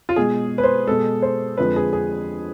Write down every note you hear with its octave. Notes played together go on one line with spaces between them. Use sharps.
F4
B2 G#3 G#4
B4
C5
B2 G#3 A4
C5
F2 D3 F3 G#3 B4
G#4
G#4